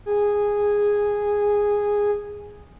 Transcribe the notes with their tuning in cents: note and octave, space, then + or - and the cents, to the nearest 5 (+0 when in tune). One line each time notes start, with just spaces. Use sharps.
G#4 -10